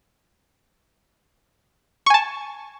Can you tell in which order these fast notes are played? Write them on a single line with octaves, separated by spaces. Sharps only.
C#6 G#5 A5